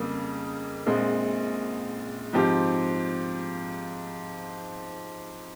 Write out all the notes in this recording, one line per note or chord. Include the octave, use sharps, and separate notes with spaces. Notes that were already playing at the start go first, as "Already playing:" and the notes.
Already playing: F2 C#3 G3 A#3
A#1 A#2 G#3 C4
G#2 F3 C4 G4